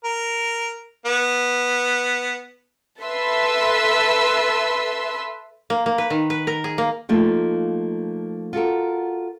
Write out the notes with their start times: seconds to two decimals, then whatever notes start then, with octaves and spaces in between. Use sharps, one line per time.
0.04 A#4
1.06 B3
3.02 A4 B4 E5 C6 E6
5.70 A#3
5.86 A#3
5.98 B4
6.10 D#3
6.30 B4
6.47 A#4
6.64 G#4
6.78 A#3
7.09 F3 A3 A#3 D#4
8.53 F4 F#4 A4 A#4